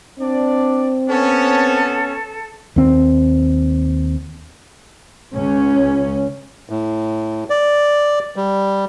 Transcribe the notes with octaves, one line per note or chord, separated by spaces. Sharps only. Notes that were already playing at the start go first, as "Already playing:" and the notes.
C4 D4 D5
B3 C#4 A4
D#2 C4
C#2 C#4
A2
D5
G3